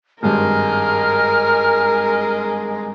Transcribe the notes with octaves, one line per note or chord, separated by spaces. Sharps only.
G#1 G2 G#3 A#4 F6